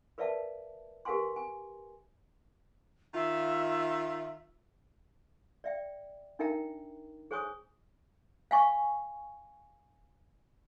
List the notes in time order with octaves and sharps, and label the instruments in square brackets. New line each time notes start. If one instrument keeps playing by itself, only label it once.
[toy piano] A#4 B4 D5 E5 F5 A5
G4 A#4 B4 F5 G#5 C6
G#5
[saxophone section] D#3 F4 [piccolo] E5
[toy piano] D5 E5 G5
D4 D#4 A#4 E5 G5 A#5
G#4 C5 C#5 G#5 C#6 D#6
F5 G#5 C#6